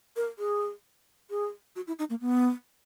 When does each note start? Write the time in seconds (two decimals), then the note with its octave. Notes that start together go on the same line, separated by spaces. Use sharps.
0.16 A#4
0.39 G#4
1.30 G#4
1.76 F#4
1.87 E4
1.99 D#4
2.10 A#3
2.21 B3